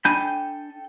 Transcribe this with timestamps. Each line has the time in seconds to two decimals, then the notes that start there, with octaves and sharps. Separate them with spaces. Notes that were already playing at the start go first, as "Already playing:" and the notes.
0.05 D4 A4 G5 G#5 B5 G6